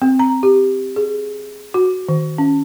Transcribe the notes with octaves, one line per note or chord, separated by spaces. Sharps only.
C4
A#5
G4
G#4
F#4
D#3
C#4